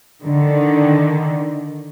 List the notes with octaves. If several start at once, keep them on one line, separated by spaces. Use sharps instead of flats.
D3 D#3